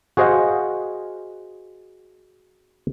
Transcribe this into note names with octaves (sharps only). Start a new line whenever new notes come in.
F#4 G#4 C5 D#5 F5 F#5